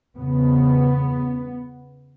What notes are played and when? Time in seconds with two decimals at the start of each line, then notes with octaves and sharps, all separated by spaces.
0.18 E2 C#3 B3